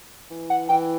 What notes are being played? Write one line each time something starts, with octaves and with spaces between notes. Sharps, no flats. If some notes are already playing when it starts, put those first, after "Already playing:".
E3
F#5
E3 G5